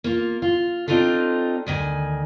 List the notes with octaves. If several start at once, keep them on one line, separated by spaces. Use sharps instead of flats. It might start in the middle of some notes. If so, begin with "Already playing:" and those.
A#3 F4
F4
C4 D4 D#4 F4 A4
D2 D#3 D5 G#5